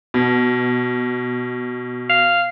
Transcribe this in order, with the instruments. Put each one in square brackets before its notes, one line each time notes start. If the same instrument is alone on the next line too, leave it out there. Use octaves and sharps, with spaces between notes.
[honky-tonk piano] B2
[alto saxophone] F5